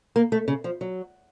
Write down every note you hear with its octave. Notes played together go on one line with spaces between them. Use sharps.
A#3
A3
C#3
F3
F#3